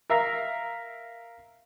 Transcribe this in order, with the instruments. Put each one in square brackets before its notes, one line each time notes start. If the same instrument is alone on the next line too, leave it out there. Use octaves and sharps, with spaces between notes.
[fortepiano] A#4 E5 F5 A#5